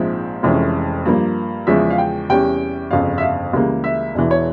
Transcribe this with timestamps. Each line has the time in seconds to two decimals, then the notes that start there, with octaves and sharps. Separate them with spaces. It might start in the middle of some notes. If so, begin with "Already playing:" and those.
Already playing: A#1 G#2 F3 G#3 C4 E5
0.43 F1 F2 E3 G#3 C#4
1.05 G2 F3 A#3
1.67 E2 C#3 F3 G#3 C#4 E5
1.90 F5
1.98 G5
2.29 E2 C3 G3 C#4 G5
2.91 G1 F2 C#3 F5
3.18 E5
3.22 F5
3.53 C#2 C#3 E3 G3 A#3
3.84 E5
4.15 E1 E2 E3
4.31 C#5